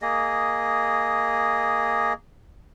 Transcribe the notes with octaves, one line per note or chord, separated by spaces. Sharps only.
A#3 G#4 D#5